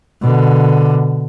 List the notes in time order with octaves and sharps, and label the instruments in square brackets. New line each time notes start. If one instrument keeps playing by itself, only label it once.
[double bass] B2 D3